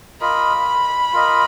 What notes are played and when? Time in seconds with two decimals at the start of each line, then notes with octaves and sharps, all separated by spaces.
0.21 F4 A#4 D#5 B5
1.13 F4 A#4 D#5